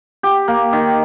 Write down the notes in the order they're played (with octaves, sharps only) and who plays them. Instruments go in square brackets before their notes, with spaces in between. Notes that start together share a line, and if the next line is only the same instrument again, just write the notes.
[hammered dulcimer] G4
A#3
D#3